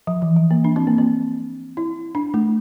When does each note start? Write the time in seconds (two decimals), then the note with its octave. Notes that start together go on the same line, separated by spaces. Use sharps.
0.07 F3
0.22 E3
0.36 F3
0.51 A#3
0.64 D4
0.76 C4
0.87 A#3
0.98 C4
1.77 E4
2.15 D4
2.34 A3